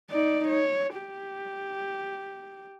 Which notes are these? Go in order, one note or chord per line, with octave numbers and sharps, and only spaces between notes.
D#4 D5
C#5
G4